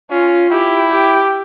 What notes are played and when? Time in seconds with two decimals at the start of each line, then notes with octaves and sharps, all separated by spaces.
0.11 C#4 F4
0.51 E4 G4
0.91 G4